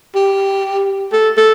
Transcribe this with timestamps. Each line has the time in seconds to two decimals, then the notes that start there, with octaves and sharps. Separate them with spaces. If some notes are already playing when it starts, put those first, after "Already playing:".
0.15 G4
1.13 A4
1.37 A4